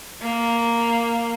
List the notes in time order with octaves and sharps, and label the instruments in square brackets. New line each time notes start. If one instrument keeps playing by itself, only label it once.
[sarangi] A#3